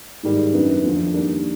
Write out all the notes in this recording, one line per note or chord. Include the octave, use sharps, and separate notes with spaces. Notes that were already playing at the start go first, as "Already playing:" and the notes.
G#2 D#3 G3
F#2 D#3 F#3 B3 D4
F2 D3 F3
D#3 G3 A#3 D4